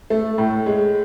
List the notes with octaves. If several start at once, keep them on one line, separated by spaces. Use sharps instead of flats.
A3
A2
G#3